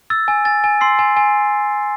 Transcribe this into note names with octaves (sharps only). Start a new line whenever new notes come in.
E6 A6
G#5
G#5 A6
G#5
C6 E6 C7
G#5
G#5